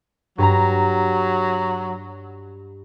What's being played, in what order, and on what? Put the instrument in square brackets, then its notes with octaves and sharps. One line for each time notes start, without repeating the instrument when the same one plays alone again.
[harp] G2 A#5 [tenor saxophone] F#3